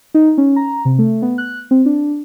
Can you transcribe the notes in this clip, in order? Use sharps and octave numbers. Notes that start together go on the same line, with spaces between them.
D#4
C#4
A#5
C3
A3
B3
F#6
C4
D4